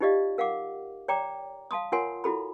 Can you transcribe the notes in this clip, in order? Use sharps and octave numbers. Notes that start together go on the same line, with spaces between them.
D#4 F4 G4 D5 D#5 F5
A#4 F5 F#5 D6
C#5 D5 G5 A#5 D6
F5 A5 C6 D#6
F4 A#4 C#5 F#5 G#5 C6
E4 F#4 A4 B5